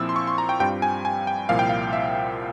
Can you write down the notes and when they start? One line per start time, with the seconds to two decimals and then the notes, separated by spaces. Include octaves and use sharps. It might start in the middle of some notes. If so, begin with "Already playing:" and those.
Already playing: A#2 F3 C4 E4 E6
0.09 C6
0.16 C#6
0.27 C6
0.38 A#5
0.49 G5
0.60 G2 G3 C4 F4 G5
0.82 G#5
1.05 G#5
1.27 G5
1.49 C2 A#2 F3 A#3 E4 F5
1.59 G5
1.69 F5
1.93 E5